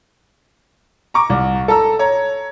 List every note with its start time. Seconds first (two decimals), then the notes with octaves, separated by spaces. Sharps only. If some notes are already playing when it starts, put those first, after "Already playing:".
1.14 A#5 C#6 D6
1.30 C2
1.68 A4 A5 A#5 E6
1.99 C#5 A#5